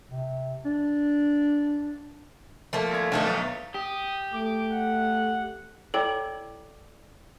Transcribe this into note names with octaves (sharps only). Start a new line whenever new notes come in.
C3
D4
F3 A3 A#3
G#1 G#6
D2 D#3 F3 A3 D#4
B1 B3 A6
G4 D#6
A3 D6
F#5
E4 A4 C#5 D5 G5 D6